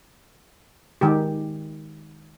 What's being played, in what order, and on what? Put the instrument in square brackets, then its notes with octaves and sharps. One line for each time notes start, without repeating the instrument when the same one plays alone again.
[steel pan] D#3 G#3 G4